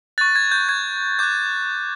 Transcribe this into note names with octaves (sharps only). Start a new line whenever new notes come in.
C#6 F#6 A6
G#6
G6
G#6
D6 F#6 G6